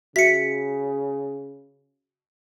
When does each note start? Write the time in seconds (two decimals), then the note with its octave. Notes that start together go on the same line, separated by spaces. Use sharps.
0.16 C#3 F#4 E5 B6 C#7